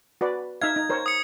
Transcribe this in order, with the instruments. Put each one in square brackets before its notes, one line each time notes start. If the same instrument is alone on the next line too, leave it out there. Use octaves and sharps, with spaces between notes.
[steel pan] F#4 B4 D5
[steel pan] D#4 E5 F5 [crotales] G#6
[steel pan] D#4
A#4 C5 C#5
[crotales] D#6 C#7